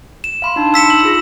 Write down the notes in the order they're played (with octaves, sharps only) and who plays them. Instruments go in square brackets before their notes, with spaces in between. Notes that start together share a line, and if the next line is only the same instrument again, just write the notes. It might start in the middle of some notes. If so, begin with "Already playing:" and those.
[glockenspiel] E7
[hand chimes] F5 B5 C6
D4 D#4 A5
[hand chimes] D#4 B5 C#7 [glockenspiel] E6 B6 E7
[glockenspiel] F#7
[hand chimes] F4 G#4 A#6